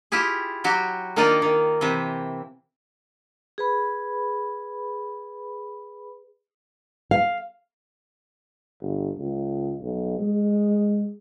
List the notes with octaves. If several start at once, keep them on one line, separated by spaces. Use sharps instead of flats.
E4 F4 G4 G#4
F#3 F#4 G4
D#3 A#3 D4 D#4 F4 D5
D#3
C3 E3 C4
G#4 B4 B5
F5
G1
C#2
B1
G#3